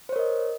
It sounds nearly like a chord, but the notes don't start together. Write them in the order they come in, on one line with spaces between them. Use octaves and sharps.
C5 C#5 A#4 D#5